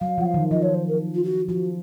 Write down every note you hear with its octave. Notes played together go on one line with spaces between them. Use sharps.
F#3 F5
F3 F#5
F5
D#3
F3 D#5
C#5
C5
A#4
F4
F#4
F3 F#4